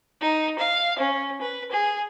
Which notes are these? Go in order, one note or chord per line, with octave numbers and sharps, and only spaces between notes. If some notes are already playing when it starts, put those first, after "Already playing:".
D#4
F5
C#4
B4
G#4